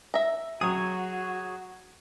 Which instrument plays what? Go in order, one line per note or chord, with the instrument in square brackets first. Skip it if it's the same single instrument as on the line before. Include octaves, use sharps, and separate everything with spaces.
[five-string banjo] E5 A#5
[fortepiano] F#3 D#6 [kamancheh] F#4 [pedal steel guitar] G#4 C#5